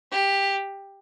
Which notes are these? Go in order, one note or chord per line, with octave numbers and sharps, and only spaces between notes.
G4